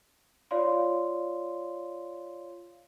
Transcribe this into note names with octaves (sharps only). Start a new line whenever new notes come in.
F4 C#5 D5 F5 C6